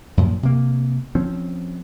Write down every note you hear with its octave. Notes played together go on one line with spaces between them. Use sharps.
F#2 A#2 F3
C3 A#3
F3 C4 C#4